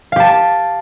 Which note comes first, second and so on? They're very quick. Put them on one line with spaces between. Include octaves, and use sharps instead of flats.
F5 G4 A5